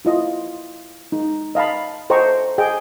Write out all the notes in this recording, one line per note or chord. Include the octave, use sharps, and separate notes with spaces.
E4 F4 D#5
D#4
D#5 F5 A5 B5
A4 C5 D#5 G5 A#5 C#6
G#4 D#5 G5